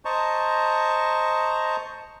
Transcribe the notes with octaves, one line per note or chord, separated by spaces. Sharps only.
C5 D#5 A5 A#5 C#6